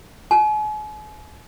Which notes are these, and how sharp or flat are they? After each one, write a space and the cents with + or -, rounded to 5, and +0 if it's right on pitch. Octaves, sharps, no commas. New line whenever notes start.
G#5 +40